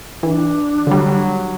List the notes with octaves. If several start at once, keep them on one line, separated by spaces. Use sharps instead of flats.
E3 D4
D3 F#3 G3